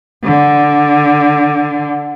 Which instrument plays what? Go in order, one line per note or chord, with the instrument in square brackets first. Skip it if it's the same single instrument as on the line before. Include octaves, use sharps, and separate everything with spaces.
[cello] D3